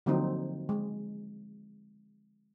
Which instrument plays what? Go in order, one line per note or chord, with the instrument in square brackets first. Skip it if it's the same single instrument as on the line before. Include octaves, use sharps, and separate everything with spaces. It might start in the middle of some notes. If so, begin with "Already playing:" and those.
[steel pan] D3 F3 F#3 A#3 C4 D#4
G#3